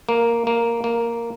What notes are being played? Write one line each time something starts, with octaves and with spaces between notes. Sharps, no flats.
A#3
A#3
A#3